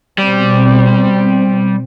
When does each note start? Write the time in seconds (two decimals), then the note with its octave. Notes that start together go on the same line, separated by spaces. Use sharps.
0.18 B2 G3 C4